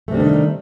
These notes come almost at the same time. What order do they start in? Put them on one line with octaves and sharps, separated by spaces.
A3 C3 G3 D4 D#3